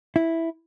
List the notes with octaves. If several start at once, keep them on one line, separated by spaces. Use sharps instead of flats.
E4